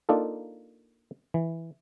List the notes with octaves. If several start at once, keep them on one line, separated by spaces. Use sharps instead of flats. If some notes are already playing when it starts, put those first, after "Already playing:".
A#3 D4 D#4 F4 A4
E3